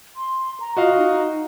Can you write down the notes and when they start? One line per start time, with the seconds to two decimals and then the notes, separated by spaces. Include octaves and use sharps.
0.16 C6
0.60 A#5
0.77 F4 F#4 D#5 F5
0.97 D#4